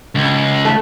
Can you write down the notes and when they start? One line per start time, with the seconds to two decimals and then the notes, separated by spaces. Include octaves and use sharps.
0.15 C#2
0.65 A3